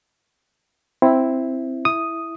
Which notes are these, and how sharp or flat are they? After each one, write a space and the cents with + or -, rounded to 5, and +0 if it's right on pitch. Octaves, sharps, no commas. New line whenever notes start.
C4 +0 E4 +0
E4 +0 D#6 +0